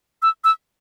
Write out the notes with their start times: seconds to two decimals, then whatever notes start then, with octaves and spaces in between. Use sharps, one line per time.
0.22 E6
0.44 E6